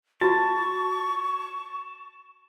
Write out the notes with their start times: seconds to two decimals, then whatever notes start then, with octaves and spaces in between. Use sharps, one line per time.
0.21 F4 F#4 A5 C#6